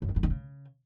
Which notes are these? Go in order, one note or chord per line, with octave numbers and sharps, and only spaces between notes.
F#2
D#3
G2
D#3
C#3